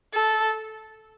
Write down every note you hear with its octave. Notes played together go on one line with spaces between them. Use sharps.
A4